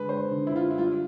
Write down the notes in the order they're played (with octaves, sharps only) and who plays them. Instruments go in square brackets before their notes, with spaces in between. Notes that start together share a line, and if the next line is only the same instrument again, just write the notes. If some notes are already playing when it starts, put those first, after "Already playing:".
Already playing: [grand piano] D3 G#3 [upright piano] B4
[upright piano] C5
[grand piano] D3
[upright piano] E4
F4
E4
[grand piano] G3 [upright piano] F4